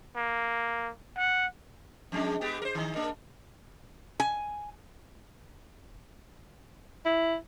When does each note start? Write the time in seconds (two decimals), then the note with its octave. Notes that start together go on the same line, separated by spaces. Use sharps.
0.16 A#3
1.17 F#5
2.12 F2 G#3 D4
2.41 G#3 B3 G4
2.62 A#4 C5
2.75 D#3 D#4
2.95 A#3 D4 A#4
4.20 G#5
7.05 E4